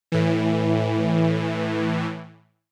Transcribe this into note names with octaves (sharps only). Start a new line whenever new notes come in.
A2 E3